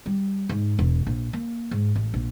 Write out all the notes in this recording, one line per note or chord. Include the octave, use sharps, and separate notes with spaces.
G3
G#2
E1
A#1
A#3
G#2
A1
A#1